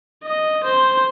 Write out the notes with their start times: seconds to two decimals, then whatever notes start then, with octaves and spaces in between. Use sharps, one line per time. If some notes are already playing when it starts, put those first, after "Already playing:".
0.24 D#5
0.64 C5